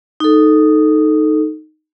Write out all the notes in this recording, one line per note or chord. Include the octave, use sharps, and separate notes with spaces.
D#4 A4